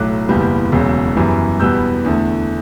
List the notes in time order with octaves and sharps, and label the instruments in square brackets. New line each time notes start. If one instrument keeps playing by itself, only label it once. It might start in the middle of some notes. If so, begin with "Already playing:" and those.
Already playing: [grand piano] B1 A2 F#3 D6 F#6
F#1 E2 B2 G3 B3
E1 E2 C#3 F#3
F#2 E3 G3 B3
E2 B2 G3 B3 E6 G6
E2 D3 A3